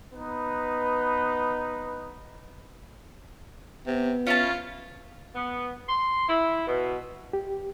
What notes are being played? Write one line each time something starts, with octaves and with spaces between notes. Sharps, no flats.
B3 D#4 B4
C3 B3
C#4 E4 F4 A5
B3
C6
E4
B2
G4